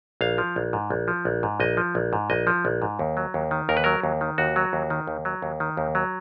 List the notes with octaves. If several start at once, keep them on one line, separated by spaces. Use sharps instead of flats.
A#1 F5
F3
A#1
G#2
A#1
F3
A#1
G#2
A#1 D#5
F3
A#1
G#2
A#1 D#5
F3
A#1
G#2
D#2
F#3
D#2
D#3
D#2 A#4
B4
F#3 A#4
D#2
D#3
D#2 F#4
F#3
D#2
D#3
D#2
F#3
D#2
D#3
D#2
F#3